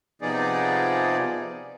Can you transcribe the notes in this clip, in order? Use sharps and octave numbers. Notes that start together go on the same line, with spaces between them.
C3 F3 B3 D#4 G#4 D5